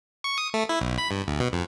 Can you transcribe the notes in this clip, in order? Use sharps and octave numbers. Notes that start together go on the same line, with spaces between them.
C#6
D#6
A3
E4
B1
B5
G2
D2
B2
F2